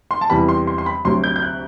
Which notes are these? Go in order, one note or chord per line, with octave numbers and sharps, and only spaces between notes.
C6
A5
E2 C3 E3 G3 B5
C6
C6
C6
B5
D2 C3 F#3 C6
G6
G6
F#6